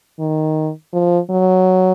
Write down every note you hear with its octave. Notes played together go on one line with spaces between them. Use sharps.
D#3
F3
F#3